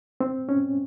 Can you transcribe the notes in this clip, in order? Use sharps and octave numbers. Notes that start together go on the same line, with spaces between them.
C4
C#4